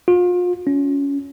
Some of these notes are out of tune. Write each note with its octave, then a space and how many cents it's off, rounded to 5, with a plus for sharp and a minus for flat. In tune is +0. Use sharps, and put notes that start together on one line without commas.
F4 +35
C#4 +20